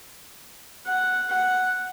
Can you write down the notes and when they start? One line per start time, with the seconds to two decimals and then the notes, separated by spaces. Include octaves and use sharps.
0.87 F#5
1.29 F#5